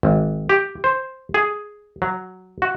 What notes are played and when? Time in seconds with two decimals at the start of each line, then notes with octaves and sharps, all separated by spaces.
0.03 G#1
0.49 G4
0.84 C5
1.34 G#4
2.02 F#3
2.62 F#4